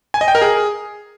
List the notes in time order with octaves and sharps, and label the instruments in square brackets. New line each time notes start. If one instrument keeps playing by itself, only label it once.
[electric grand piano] G#5
D#5
G5
A#4
G#4